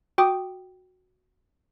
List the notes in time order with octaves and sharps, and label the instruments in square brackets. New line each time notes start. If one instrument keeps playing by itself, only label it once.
[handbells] F#4 G5 D6 D#6